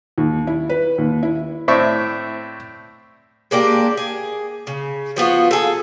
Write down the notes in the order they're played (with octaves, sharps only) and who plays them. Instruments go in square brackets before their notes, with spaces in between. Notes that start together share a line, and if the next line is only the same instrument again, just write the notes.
[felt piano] D#2
E4
B4
D#2
E4
[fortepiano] A2 C4 D5 E5 C#6
[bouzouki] G#3 A#3 D4 G4
G#4
C#3
F3 B3 F4 F#4
G#4 A4